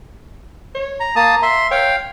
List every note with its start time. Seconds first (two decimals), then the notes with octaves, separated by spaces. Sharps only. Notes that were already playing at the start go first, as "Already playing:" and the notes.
0.75 C#5
1.00 A#5
1.16 A#3 A5 A#5 D#6
1.43 E5 C6
1.71 C#5 F5 G5